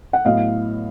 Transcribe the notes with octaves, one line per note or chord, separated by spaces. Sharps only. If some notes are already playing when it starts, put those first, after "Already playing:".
F#5
A2 F#3 B3 E4 D#5 F5